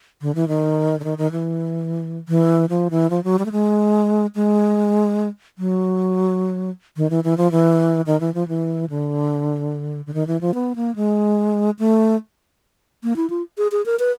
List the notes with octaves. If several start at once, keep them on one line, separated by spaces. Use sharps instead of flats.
D3
E3
D#3
D3
D#3
D#3
E3
E3
F3
E3
F3
F#3
G3
A3
G#3
G#3
F#3
D#3
E3
E3
F3
E3
D#3
E3
F3
E3
D3
D3
D#3
E3
F3
B3
A#3
G#3
A3
A#3
E4
F4
G#4
G#4
A#4
B4